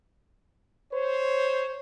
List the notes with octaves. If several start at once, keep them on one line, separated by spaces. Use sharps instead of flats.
C5 C#5